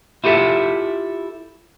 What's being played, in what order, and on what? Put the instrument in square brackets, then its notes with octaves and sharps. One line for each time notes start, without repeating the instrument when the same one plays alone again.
[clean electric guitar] E4 F4 G4 A4 E5